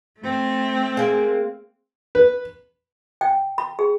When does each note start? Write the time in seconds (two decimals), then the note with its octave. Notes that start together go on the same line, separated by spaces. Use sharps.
0.20 A3 C4
0.97 G#3 A#3
2.15 B4
3.21 G5
3.58 B5
3.79 G#4